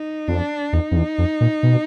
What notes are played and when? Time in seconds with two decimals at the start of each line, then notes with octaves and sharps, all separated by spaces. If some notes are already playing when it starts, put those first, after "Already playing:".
Already playing: D#4
0.28 F2 D4
0.73 E2 D#4
0.91 F2
0.96 E2
1.18 F2
1.41 A#2
1.63 B2